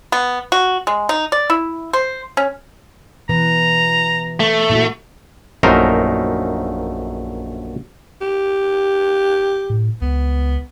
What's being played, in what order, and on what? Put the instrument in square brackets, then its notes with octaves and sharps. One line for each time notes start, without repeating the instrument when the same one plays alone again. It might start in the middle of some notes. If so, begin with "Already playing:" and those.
[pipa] B3
F#4
G#3
D#4
D5
E4
C5
C#4
[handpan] B2 E3 B4 [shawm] A#5
[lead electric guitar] A3
[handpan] A#2 E4 F#4
[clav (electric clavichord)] A#1 F#2 A3 D#4 A#4 C5
[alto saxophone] G4
[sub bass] A2
[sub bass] C#2 [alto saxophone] B3